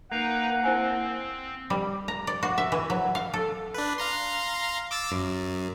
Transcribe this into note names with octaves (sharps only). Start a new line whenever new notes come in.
A#3 D#4 B4 F#5 A#5
C4 E4 C5 G#5
G3
A#5
D5
F#4
E5
E3
F#3
F5
A4
D4 B4
F5 A#5 C6
D6 E6 A6
F#2